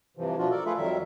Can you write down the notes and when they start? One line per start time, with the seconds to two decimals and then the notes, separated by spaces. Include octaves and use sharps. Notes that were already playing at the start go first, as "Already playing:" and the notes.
0.17 G2 C3 E3 F3
0.38 B2 F3 D4 F4 F#4
0.50 A4 A#4 D5
0.66 A3 F4 G#4 A4 B4 E5
0.77 F2 D#3 F#3 G3 A#4 E5